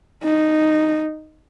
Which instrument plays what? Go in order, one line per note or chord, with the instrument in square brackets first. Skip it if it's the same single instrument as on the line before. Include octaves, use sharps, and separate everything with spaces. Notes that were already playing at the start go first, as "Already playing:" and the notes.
[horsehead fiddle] D#4